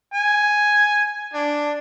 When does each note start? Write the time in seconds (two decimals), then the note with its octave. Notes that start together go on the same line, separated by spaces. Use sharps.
0.14 G#5
1.34 D4